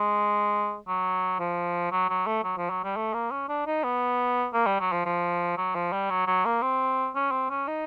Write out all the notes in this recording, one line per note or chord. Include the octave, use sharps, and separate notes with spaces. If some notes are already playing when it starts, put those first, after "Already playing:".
Already playing: G#3
F#3
F3
F#3
F#3
A3
F#3
F3
F#3
G3
A3
A#3
C#4
D4
D#4
B3
A#3
G3
F#3
F3
F3
F#3
F3
G3
F#3
F#3
A#3
C4
C#4
C4
C#4
D#4